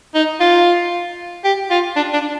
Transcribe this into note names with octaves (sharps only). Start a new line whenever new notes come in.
D#4
F4
G4
F4
D4
D4